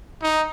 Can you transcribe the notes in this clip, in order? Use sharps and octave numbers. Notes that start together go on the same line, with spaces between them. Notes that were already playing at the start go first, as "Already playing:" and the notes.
D#4